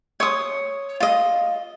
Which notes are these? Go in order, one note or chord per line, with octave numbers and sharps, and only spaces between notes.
C#5 C6 D#6
F4 D#5